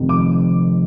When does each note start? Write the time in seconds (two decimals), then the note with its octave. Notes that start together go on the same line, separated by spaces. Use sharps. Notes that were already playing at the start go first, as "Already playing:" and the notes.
Already playing: F1 F2 C3 D#3
0.09 D6